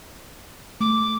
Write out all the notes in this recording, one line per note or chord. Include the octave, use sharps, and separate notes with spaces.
A3 D6